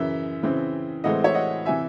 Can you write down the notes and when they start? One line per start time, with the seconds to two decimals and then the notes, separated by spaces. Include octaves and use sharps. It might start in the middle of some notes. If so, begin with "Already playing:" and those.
Already playing: F#2 C#3 E3 E5
0.43 C#3 E3 C4
1.04 A2 E3 G#3 C4 D#5 F#5
1.24 C#5 E5
1.34 D#5 F#5
1.65 C3 E3 E5 G#5